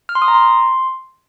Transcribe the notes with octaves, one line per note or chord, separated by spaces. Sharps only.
F6
C6
D#6
A#5
C6